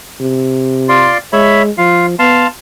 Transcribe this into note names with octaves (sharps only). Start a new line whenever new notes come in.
C3
F4 D5 C6
G#3 C#5 E5 B5
F3 F4 F5
B3 F5 A5 C6